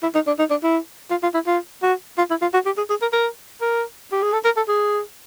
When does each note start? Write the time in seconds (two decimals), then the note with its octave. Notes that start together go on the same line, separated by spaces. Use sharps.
0.03 E4
0.15 D#4
0.27 D4
0.39 D#4
0.51 D4
0.63 E4
1.11 F4
1.23 F4
1.34 E4
1.47 F4
1.82 F#4
2.18 F4
2.30 E4
2.42 F4
2.54 F#4
2.66 G4
2.77 G#4
2.90 G#4
3.02 A#4
3.13 A#4
3.61 A#4
4.12 G4
4.22 G#4
4.33 A4
4.45 A#4
4.57 A4
4.68 G#4